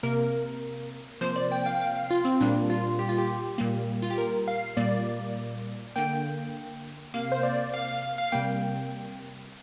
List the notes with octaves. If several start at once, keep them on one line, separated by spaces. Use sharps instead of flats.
C3 A#3 A#4
C3 F3 A#3 C5
D5
G5
G5
F5
G5
F5
F5
F4
C4
A#2 G3 A#3 D4
F4
G4
F4
G4
A#2 G3 A#3
F4
G4
A#4
F5
A#2 G3 A#3 D5
D3 A#3 G5
C3 A#3 F5
C5
D5
F5
F5
F5
F5
C3 G3 A#3 G5